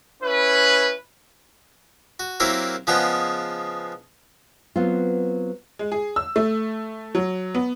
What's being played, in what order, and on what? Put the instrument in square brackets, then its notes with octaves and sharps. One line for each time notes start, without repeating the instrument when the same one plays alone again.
[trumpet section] C#4 E4 B4
[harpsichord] F#4
F#3 A#3 C4 E4 G4 A#4
C#3 F3 G#3 B3 F#5 G5
[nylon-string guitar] F#3 B3 C4 F4
[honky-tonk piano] G#3
G#4
E6
A3
F#3
B3